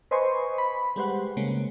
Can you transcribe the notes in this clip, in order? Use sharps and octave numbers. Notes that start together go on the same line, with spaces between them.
B4 C5 D#5 G#5 C6 C#6
B5
G3 G#3 G4 B4 C5 F#5
C#3 G#3 A#3